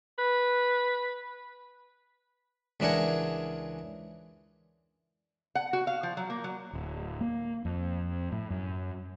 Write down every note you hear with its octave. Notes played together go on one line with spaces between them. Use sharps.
B4
C#2 E3 D4 G#4 A#4 F#5
F#5
F#4
F5
F3
F#3
A#3
F#3
D1
A#3
F2
A2
F#2